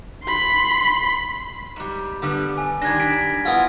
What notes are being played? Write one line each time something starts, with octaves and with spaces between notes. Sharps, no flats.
B5 C6
G#2 G3
D3 G3 B3
G#5
D#3 G3 D4 G#6 A#6
B6 D7
B3 E4 F4